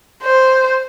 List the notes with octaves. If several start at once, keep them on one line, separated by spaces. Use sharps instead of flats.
C5